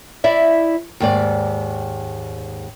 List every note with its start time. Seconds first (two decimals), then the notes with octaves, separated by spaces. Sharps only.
0.24 E4 D5 E5
1.00 D#2 G#2 D5